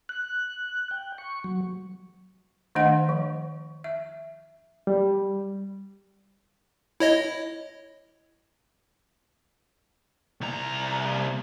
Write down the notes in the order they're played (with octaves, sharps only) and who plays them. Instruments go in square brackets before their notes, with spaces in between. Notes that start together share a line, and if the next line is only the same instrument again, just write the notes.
[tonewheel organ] F#6
G5
C#6
F#3
[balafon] D#3 A3 D4 C5 D#5 F#5
F3
E5
[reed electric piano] G3
[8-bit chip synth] E4 C#5 D#5
[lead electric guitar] C2 A#5